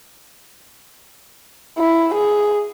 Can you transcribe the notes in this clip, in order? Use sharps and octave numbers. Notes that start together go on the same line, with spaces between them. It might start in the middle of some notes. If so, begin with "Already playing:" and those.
E4
G#4